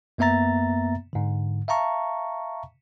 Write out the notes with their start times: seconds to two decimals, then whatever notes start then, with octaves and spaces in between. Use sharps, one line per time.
0.18 F#2 A#3 B3 E5 A#5 A6
1.13 G#2 D3
1.68 E5 F5 A5 A#5 C#6